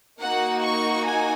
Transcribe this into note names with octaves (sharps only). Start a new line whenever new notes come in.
A#3 D#4 F#4 F#5
C#6
G#5